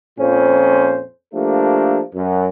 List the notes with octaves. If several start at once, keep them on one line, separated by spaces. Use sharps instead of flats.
F2 A#2 F3 C#4 C5
F3 A3 A#3 D4 G4 A4
F#2